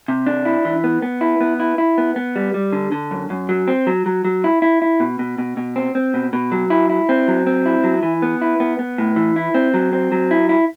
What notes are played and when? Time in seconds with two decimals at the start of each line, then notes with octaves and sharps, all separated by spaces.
0.08 C3
0.27 D4
0.45 E4
0.65 E3
0.84 B3
1.02 B3
1.21 E4
1.41 B3
1.60 E4
1.78 E4
1.98 B3
2.16 B3
2.36 G3
2.54 G3
2.73 D3
2.92 D3
3.11 F#2
3.30 F#2
3.49 F#3
3.68 C4
3.87 F#3
4.06 F#3
4.25 F#3
4.44 E4
4.62 E4
4.82 E4
5.00 B2
5.19 B2
5.38 B2
5.57 B2
5.76 C4
5.95 C4
6.14 B2
6.33 B2
6.52 F#3
6.70 E4
6.90 E4
7.09 C4
7.28 F#3
7.46 C4
7.66 E4
7.84 F#3
8.03 E3
8.22 B3
8.41 E4
8.60 B3
8.79 B3
8.98 A2
9.16 E3
9.36 E4
9.54 C4
9.74 F#3
9.93 C4
10.12 F#3
10.31 E4
10.49 E4